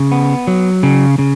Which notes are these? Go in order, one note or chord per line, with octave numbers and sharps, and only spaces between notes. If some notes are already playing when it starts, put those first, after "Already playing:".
Already playing: C#3
B3
F#3
C#3
C#3